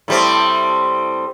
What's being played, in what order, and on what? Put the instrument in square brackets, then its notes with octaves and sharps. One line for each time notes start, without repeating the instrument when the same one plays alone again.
[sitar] A2 G3 C4